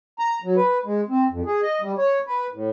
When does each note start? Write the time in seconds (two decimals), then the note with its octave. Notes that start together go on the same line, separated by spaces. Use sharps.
0.19 A#5
0.44 F#3
0.57 B4
0.85 G#3
1.09 C4
1.30 F2
1.46 G#4
1.62 D#5
1.81 G3
1.98 C#5
2.27 B4
2.53 A2